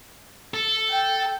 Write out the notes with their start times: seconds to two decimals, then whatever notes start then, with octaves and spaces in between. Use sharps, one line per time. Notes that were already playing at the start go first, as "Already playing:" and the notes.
0.54 A4
0.89 G5